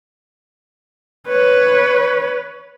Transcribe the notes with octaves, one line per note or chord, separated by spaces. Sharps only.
B4 C#5